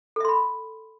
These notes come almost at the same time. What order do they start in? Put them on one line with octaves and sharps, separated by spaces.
A4 E5 C6 B5